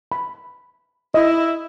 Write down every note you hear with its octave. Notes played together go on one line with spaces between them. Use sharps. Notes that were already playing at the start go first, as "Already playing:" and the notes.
B5
E4 D#5